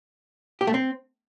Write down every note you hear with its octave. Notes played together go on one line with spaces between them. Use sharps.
G4
A3
C4